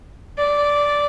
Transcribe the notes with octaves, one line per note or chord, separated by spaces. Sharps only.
D5